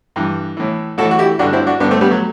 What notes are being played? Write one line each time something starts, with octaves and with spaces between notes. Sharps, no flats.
G2 E3
A2 E3
A2 E3 F#4 A4
F#4
E4 G4
G2 D3 D4 F#4
C4 E4
D4 F#4
G2 D3 B3 D4
A3 C4
G3 B3
F#3 A3